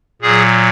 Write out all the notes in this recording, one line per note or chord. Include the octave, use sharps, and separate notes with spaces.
A#2 F#3 G#4